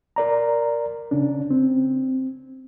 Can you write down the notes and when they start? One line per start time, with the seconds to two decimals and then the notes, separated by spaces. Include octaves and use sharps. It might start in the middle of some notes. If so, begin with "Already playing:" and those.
0.16 A#4 D5 A#5
1.11 C#3 C#4 D4
1.51 C4